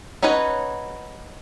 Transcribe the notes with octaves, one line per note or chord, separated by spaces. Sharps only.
C#4 D#4 F#4 B4 C#5